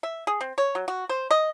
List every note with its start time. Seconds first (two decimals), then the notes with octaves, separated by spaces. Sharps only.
0.03 E5
0.27 G#4
0.41 C4
0.58 C#5
0.75 F#3
0.88 F#4
1.09 C5
1.31 D#5